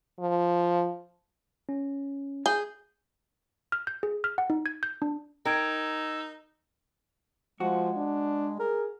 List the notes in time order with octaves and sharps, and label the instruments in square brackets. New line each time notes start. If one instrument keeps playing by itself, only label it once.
[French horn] F3
[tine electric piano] C#4
[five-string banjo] G#4 [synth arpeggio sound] G6
[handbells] F6
G6
G#4
F6
F#5
D#4
G#6
G6
D4
[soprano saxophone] D#4 [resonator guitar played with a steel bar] A#4 [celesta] G5 G#6 D7 [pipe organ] E6
[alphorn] F3 [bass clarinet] G#3 [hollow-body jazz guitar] F#4
[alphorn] D4
[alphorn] G#4 [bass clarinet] A#4